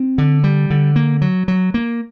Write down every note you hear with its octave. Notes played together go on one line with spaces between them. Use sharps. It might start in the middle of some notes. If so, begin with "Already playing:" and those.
Already playing: C4
D3
G3
D3
A#3
F#3
F#3
A#3